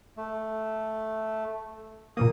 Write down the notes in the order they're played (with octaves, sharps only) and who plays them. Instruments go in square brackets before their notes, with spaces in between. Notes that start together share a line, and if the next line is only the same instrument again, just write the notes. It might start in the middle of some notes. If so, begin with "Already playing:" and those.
[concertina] A3
[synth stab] A#2 E3 A#3 [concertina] D#6